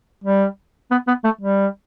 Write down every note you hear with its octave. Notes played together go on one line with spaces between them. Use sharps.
G3
B3
B3
A3
G3